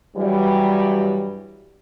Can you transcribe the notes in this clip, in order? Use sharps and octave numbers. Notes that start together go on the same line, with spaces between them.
G2 E3 F#3 G3